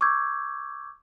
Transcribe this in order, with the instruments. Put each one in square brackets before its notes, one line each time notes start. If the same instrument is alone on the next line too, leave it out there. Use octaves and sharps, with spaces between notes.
[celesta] C#6 D6 E6 G6 G#6